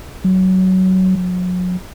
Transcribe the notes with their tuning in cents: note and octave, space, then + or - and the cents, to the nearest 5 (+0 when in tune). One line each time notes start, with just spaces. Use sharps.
F#3 +15
F#3 -35